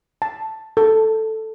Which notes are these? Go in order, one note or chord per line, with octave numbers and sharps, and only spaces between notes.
A5
A4